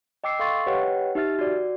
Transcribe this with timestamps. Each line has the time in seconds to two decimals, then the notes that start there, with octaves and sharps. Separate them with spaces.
0.24 D#5 G5 D6 E6 C7 C#7
0.39 A4 F5 C6 C#6 A6
0.66 G4 B4 C#5 D#5 F#5 G5
1.15 D#4 G4 E5 F6 A6
1.39 F#4 D5